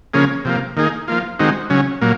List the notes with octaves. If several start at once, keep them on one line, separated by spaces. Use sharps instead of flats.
C#3 F3 A#3 C#4 G#4
C3 F3 A#3
D#3 A#3 D#4 G#4
F3 A#3 F4
D#3 G#3 C4 D#4 F#4
C#3 F#3 C#4
A#2 F#3 A#3